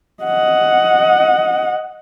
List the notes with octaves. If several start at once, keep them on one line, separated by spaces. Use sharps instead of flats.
D#5 F#5